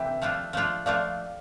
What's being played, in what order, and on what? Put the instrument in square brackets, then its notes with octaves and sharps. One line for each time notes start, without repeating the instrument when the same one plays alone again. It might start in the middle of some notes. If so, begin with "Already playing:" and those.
Already playing: [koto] C3 E3 G4 [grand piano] E5 G5
[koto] F3 A3 D4 F4
F3 A3 D4 F4
[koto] F3 A3 D4 F4 [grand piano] D5 F5